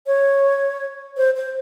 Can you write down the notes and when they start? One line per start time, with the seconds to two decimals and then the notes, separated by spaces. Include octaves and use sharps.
0.07 C#5
1.17 C5
1.36 C5